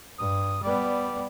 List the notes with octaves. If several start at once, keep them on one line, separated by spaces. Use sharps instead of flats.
G2 D#6
G3 B3 D5